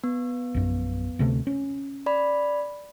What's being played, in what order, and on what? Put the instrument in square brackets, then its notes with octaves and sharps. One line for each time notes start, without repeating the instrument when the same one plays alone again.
[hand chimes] B3
[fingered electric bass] A#1 F#2
D2 C3 A3
C#4
[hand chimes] D5 B5